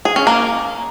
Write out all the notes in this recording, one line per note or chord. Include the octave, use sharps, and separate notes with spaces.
G#4
C#4
A#3